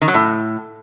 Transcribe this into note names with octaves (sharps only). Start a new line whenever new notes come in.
D#3
F#3
A2